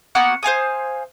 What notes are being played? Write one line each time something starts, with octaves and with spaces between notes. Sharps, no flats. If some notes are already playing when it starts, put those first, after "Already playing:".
A#3 B3 F#4 F#5
C5 F5 G#5 D#6